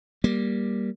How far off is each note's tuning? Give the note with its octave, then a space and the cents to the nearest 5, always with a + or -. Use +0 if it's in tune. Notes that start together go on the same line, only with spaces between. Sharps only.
G3 +0 A#3 +15